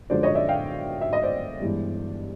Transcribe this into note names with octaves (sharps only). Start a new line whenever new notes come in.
F#2 D3 F3 G#3 C5 D5
C#5 D#5
D5 E5
F5 G5
E5
D#5
C5 D5
G1 G2 E3 G#3